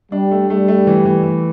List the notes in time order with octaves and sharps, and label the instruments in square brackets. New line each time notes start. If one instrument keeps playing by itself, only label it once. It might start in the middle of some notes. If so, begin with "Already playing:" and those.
[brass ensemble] G3 [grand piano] D4
[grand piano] A3
[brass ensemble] G3 [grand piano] A3
[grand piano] A3
E3
E3
E3